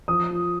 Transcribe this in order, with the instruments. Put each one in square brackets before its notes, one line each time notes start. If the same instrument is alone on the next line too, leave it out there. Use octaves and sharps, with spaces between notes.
[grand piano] F3 D#6
F4